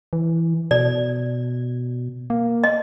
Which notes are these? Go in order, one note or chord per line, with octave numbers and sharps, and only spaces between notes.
E3
B2 D5
A#3
D#5